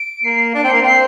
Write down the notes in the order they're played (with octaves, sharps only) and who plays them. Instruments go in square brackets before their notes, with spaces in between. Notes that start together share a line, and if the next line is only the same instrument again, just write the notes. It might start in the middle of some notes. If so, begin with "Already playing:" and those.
Already playing: [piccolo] D7
[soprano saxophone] A#3 [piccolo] C7
[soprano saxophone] D4 [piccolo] D7
[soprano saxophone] C4
[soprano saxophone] A#3 [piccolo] C7
[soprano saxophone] C4 [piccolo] C7